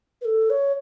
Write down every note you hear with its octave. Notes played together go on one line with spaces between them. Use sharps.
B4
A4
C#5